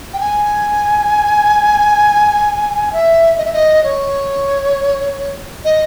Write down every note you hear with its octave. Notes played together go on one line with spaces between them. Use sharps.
G5
G#5
E5
D#5
E5
D#5
C#5
D#5